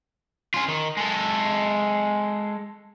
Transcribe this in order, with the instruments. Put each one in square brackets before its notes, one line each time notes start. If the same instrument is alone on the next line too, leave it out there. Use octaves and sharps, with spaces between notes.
[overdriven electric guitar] C#4 F4
D#3
G#3 A4